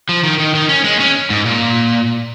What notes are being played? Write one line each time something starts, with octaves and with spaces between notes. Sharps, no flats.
F3
D#3
D#3
D#3
C#4
G#3
C#4
G#2
A#2